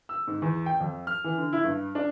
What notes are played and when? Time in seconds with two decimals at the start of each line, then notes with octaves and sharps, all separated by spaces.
0.09 E6
0.27 G#2
0.42 E2
0.66 G5
0.80 F2
1.07 F6
1.24 E3
1.38 D3
1.53 E4
1.64 G2
1.95 D4